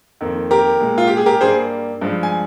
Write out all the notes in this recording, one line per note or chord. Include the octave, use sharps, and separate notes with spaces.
F2 D#3 A#3
G4 A#4
A#2 G#3
F4
G4
G#4
G4 A#4
G2 G3 A#3 G#4 C5
G2 F3 G#3
G#5